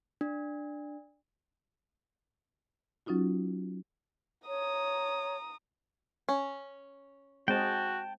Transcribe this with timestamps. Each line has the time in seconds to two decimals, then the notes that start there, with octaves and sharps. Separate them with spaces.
0.21 D4
3.06 F#3 C#4 D#4 F4 F#4
4.48 C#5 A#5 D#6
6.29 C#4
7.48 G#3 C4 F#4 G5 A5